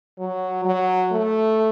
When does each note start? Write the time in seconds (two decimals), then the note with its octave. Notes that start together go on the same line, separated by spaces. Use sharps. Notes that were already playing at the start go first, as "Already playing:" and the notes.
0.19 F#3
0.65 F#3
1.12 A3